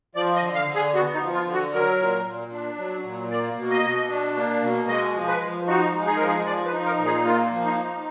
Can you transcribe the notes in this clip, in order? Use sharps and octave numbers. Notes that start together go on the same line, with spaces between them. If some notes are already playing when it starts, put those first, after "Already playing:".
F3 D5
D#5
D3
F5
D3
G#4
B3 F#4
D#4
F3
F4
D3
F#4
F#3 A#4
A#2
A#2
D4
F#3
A#2
A#3 D5
B2
D#5
B2
D4
A#3
B2
G#3 D#5
F3
B4
F3
D#4 F#4
G#3
G#4
F3 A#4
G#4
F3 D5
B4
D#4
A#4
A#2
G#4
A#3 F4
F3
D#4
D#4